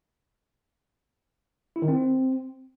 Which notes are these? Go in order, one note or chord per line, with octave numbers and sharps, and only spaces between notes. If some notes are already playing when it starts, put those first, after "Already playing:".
E4
D#3
C4